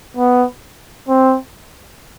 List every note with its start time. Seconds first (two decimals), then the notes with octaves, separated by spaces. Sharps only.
0.17 B3
1.08 C4